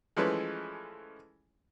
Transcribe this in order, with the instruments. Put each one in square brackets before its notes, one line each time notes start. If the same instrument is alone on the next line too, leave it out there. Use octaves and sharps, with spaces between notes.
[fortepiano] E3 F3 G#3 A3 C#4 B4